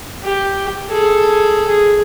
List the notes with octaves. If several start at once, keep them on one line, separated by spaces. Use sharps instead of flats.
G4
G#4 A4
G#4